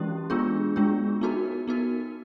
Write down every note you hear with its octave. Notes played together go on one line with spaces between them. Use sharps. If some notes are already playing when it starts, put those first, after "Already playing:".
Already playing: E3 G#3 C#4 E4 G4
G#3 B3 D4 F4 G#4
G#3 B3 D4 F4 G#4
B3 D#4 F#4 A#4
B3 D#4 F#4 A#4